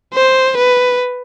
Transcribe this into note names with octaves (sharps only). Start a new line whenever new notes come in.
C5
B4